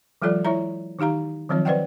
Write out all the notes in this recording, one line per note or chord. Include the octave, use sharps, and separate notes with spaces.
E3 F#3 G#3 F4 A4 D5
E4 C#5 E5 A#5
D#3 D#4 G4 F5 A#5
D#3 F3 F#3 C4 F4 C#5
B4 C5 D5 D#5 F#5 G5